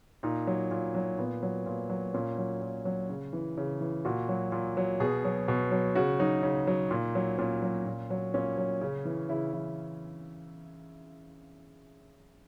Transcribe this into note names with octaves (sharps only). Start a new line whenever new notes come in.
A#2 D#4
F#3
A#2
F#3
A#2 B3
F#3
A#2
F#3
A#2 C#4
F#3
A#2
F#3
C#3
E3
C#3
E3
A#2 F#4
F#3
A#2
F#3
B2 G#4
F#3
B2
F#3
C#3 F#4
F#3 D#4
C#3
F#3
A#2
F#3
A#2 C#4
F#3
A#2
F#3
A#2 C#4
F#3
C#3
E3
C#3 E4
E3 E4